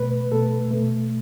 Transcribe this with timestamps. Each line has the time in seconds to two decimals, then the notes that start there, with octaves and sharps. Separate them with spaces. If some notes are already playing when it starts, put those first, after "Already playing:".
Already playing: B2 A3 B4
0.32 B2 A3 A4
0.71 B2 A3